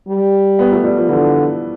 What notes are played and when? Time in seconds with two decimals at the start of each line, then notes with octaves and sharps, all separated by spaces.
0.08 G3
0.59 B3
0.72 A3
0.84 G3
0.97 F3
1.09 D3 E3